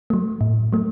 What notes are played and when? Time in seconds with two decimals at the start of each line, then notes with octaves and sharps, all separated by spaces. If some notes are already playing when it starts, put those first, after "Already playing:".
0.10 F#3 A3
0.41 A2
0.73 F#3 A3